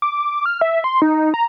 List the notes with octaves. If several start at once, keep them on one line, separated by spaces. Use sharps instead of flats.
D6
F6
E5
C6
D#4
A#5